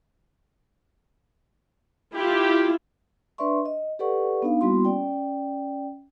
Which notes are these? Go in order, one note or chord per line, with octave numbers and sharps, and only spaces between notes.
E4 F4 G4
D4 B4 D5 E5 C6 C#6
D#5
G4 A4 B4 D5 F#5 C#6
B3 D4 D#4 F5
G3 A#3 B3 E4 F#4 C6
C#4 D5 G5